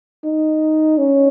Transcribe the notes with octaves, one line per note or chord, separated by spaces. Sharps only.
D#4
C#4